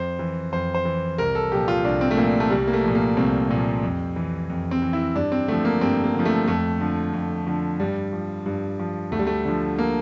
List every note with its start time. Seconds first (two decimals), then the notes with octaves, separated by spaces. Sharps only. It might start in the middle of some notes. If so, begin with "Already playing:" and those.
Already playing: F2 C5
0.19 E3
0.52 F2 C5
0.74 C5
0.85 E3
1.18 C2 A#4
1.35 A4
1.52 A#2 F3 G4
1.68 F4
1.85 C2 D4
2.01 C4
2.11 A3
2.17 A#2 F3 A#3
2.40 A3
2.50 C2 G3
2.67 A#3
2.73 A3
2.84 A#2 F3
2.95 A#3
3.17 C2 C4
3.51 A#2 F3
3.83 F2
4.16 E3
4.50 F2
4.71 C4
4.82 E3
4.93 E4
5.15 G2 D4
5.32 C4
5.48 D3 F3 A3
5.65 A#3
5.81 G2 C4
6.04 A#3
6.15 D3 F3
6.25 A3
6.47 F2 A3
6.80 D3 F3
7.13 F2
7.47 D3 F3
7.80 G2 G3
8.13 F3
8.46 G2
8.79 F3
9.11 D2 A3
9.19 G3
9.27 A3
9.45 D3 F3
9.79 A#3